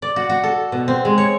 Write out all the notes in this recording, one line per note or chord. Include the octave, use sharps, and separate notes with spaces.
D5
F#4
F#4
A4
B2
C4
G#3
C#5